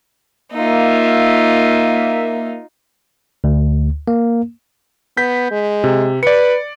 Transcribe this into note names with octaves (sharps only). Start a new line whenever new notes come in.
A#3 D#4 F4 E5
D2
A#3
B3 G6 B6
G#3
C3
B4 D5 C#7